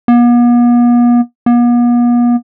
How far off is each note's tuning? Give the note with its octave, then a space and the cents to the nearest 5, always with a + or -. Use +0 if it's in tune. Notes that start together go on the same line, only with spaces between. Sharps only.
B3 -45
B3 -45